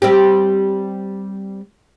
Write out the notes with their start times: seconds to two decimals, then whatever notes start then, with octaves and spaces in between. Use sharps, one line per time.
0.02 G3 C4 G4